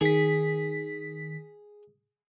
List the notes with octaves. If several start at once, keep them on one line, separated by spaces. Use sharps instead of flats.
D#3 G#4 B6